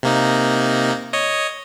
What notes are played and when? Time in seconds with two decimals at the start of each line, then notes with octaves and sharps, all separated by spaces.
0.03 C3 A#3 D#4
1.13 C#5 D#5